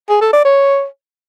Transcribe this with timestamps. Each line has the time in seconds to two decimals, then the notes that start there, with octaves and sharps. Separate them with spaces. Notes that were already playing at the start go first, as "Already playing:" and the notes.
0.09 G#4
0.21 A4
0.33 D5
0.45 C#5